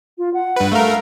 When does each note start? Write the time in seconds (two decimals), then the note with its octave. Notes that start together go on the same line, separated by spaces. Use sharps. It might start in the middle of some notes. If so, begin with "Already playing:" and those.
0.18 F4
0.34 F#5
0.56 G2 B4
0.72 A3 A#4 F5